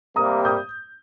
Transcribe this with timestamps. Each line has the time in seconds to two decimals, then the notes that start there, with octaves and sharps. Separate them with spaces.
0.16 C3 G3 A#3 A#5 D#6
0.45 D#6 G6